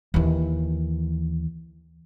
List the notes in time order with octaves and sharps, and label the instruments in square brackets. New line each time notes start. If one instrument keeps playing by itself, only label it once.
[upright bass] D#2 E3